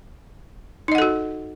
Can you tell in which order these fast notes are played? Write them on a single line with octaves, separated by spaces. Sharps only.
D#4 D#5 F#5 A4 F#4